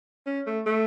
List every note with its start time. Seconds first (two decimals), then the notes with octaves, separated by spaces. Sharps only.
0.26 C#4
0.46 A3
0.66 A3